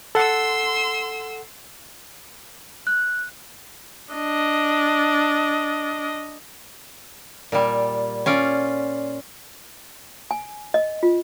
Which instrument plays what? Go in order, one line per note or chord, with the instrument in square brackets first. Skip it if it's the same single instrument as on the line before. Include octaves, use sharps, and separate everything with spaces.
[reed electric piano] A4 F#5 [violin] C6 E6
[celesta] F#6
[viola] D4 D#5
[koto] A#2 G3
C#4 F4 D5
[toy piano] G#5
D#5
F4